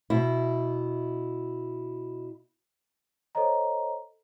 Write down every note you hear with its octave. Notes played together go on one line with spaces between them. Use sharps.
B2 E4
A4 C5 C#5 D#5 A#5